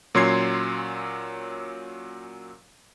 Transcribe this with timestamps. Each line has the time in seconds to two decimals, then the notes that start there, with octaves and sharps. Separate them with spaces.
0.15 A#2 F#3 C#4 C6 G#6 C7